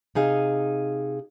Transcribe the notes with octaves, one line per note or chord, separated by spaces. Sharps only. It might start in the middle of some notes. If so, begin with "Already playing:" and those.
C3 D#4 G#4 F5